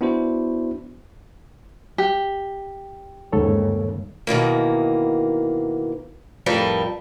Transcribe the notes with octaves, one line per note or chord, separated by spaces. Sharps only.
B3 D4 E4 F#4 C5
G4
G1 D#2 G#2 C#3 A4 C#5
B2 D#3 E3 A#3
F2 A2 G3 A#4 B4 A5